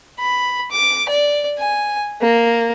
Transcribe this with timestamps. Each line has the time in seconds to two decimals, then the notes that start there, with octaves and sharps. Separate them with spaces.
0.20 B5
0.71 D6
1.09 D5
1.58 G#5
2.22 A#3